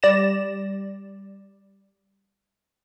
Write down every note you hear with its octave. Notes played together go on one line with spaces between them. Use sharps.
G3 D5 A#6 E7